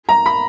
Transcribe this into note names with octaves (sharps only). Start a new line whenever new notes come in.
A#5
B5